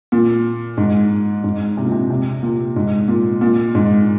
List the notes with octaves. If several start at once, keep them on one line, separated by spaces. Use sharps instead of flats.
A#2
G#2
G#2
C3
A#2
C3
C3
A#2
G#2
A#2
A#2
G#2